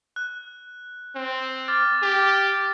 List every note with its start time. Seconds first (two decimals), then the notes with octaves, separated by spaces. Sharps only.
0.16 F#6
1.16 C4
1.68 D6 F6 A6
2.02 G4